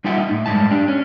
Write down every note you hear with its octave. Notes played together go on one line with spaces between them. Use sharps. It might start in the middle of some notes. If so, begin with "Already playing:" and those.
G3 D#4 F4 E5 F#5 G5
D#4
A2
G2 C#3 G#3 A5
D4 G4
C#4